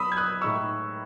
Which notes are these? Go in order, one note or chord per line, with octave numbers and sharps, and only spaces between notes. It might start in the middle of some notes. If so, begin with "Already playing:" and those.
Already playing: F#3 B3 D#4 B5 D#6 E6
G#6
D#6 F#6
A2 G#3 D#4 C#6 E6